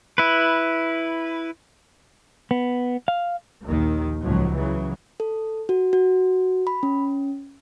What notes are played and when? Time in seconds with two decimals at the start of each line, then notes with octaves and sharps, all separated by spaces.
0.18 E4 B4
2.51 B3
3.08 F5
3.66 A#1 D#2 D#3
4.22 C#2 A2 F3 F#3
4.54 C#3 E3 F#3
5.20 A4
5.69 F#4
5.93 F#4
6.67 B5
6.83 C#4